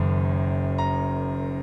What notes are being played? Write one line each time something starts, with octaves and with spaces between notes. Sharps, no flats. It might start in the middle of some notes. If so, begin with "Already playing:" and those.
Already playing: F#1 F#2 D#3
A#5